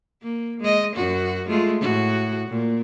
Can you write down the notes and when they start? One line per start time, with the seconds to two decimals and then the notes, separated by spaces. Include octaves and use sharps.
0.22 A#3
0.60 G#3 D#5
0.96 F#2 F#4
1.48 G#3 A3 F4
1.82 A2 F#4
2.48 A#2